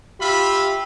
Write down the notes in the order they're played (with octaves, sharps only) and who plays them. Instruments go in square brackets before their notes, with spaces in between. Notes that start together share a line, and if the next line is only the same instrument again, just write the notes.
[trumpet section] F4 E5 B5 [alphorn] G4